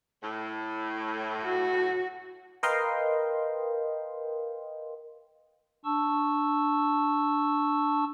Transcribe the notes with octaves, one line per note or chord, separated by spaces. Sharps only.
A2
F#4
A#4 B4 D#5 F5 G5 C6
D4 A5 C#6 E6